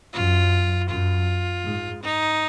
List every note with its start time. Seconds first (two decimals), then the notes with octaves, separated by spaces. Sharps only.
0.13 F#2 F4
0.89 F#2 F4
1.64 G#2
2.02 D#4